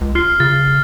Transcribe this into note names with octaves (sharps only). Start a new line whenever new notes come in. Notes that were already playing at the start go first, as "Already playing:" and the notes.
C#2
F4 F6 C7
C#3 A6